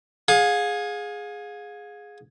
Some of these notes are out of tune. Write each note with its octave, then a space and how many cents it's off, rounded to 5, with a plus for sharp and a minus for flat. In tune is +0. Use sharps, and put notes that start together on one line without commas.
G#4 +0 F5 +35